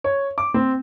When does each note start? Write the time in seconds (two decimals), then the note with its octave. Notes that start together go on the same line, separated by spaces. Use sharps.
0.04 C#5
0.38 D6
0.54 C4